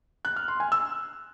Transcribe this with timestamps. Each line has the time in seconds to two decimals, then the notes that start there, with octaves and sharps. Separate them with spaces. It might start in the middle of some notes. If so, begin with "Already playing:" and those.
0.25 F#6
0.36 F6
0.48 C6
0.60 G#5
0.72 E6